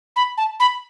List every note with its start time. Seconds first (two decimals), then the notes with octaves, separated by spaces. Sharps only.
0.16 B5
0.38 A5
0.60 B5